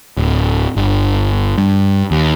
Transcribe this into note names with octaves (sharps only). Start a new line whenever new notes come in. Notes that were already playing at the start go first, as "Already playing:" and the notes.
D1
G1
G2
D#2